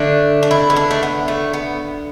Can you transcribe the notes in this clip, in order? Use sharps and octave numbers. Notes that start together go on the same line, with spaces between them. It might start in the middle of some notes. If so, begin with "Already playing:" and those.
Already playing: D3 A3 D4
D4
E4
B3
D4
A3
B3
A3
B3